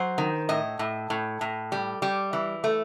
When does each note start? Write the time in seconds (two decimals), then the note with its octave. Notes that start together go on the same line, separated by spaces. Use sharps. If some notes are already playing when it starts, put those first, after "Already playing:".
Already playing: F#3 C5
0.18 D#3
0.49 A2 D#5
0.79 A2
1.10 A2
1.41 A2
1.72 G3
2.02 G3
2.33 E3
2.64 A3